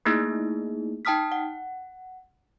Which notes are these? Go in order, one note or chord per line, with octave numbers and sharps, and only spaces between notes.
A3 A#3 D#4 E4 G#4
D#4 G5 A5 D#6 F6 B6
F#5